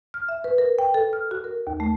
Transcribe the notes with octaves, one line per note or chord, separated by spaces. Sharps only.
F6
E5
B4
A#4
G5
A4
F6
F#4
A#4
D#2
A3